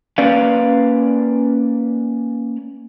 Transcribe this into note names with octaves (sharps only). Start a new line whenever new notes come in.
A#3 C#4 B4 D5 F5